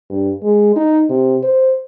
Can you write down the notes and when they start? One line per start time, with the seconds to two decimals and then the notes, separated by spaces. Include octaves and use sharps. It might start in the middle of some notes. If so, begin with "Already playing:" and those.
0.10 G2
0.43 G#3
0.76 D#4
1.10 C3
1.43 C5